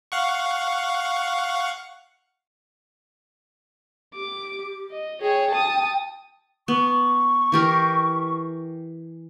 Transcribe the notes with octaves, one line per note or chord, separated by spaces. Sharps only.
F5 F#5 C#6
G4 D6
D#5
G#4 C#5 G5
A5 D#6
B3 C#6
E3 G4 A#4